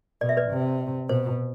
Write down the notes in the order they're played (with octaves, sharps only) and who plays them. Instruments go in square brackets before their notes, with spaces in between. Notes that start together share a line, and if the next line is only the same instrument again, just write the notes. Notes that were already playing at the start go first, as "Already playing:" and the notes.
[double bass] B2 [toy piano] D5
[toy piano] E5
B4 D5
[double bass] C3
[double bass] B2 [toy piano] C5